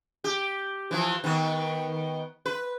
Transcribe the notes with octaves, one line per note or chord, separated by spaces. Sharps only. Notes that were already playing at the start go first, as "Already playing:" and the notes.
G4
E3 F3
D#3 B3
B4